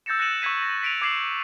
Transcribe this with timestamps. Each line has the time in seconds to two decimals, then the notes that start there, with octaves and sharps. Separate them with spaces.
0.06 E6 G6 A6 A#6 C#7 E7
0.19 F#6 A#6 C#7 D#7 E7 F#7
0.42 C#6 E6 G#6 B6 D#7
0.62 A#6
0.83 B6 D7 D#7 F7 F#7
1.02 D6 G#6 C7 E7 F#7